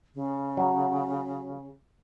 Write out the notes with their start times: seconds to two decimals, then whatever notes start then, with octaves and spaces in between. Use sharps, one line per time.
0.15 C#3
0.57 F#3